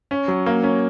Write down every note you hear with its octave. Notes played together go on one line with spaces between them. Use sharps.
C#4
F#3
A#3
C#4